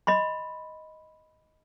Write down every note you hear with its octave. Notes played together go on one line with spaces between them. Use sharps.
D#5 B5 C6